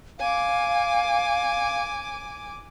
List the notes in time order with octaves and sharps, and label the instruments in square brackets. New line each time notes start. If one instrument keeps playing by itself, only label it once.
[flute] F5 [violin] G#5 D6